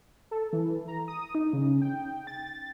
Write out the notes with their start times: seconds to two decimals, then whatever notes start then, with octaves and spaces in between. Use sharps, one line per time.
0.31 A4
0.53 E3
0.88 A#5
1.08 D#6
1.35 D#4
1.53 C#3
1.82 G5
2.27 A6